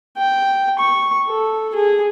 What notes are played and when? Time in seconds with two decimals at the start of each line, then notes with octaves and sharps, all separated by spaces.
0.17 G5
0.79 C#6
1.28 A4
1.74 G#4